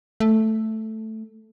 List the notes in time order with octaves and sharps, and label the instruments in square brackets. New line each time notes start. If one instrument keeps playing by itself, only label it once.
[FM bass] A3